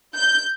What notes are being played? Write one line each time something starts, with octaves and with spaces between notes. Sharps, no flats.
G6